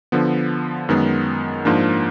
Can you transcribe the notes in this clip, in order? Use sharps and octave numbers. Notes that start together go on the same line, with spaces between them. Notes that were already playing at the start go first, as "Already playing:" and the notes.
D3 F3 B3
F#2 D#3 G#3 B3
G#2 F3 A#3 D4